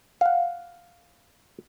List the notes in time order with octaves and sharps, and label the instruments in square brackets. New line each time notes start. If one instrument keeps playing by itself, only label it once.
[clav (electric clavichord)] F5 F#5